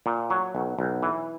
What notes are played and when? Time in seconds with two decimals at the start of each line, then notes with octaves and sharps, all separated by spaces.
0.06 A#2
0.30 F#3
0.55 B1
0.79 B1
1.03 E3